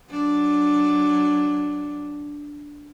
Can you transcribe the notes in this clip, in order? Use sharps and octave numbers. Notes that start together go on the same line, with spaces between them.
F#3 D4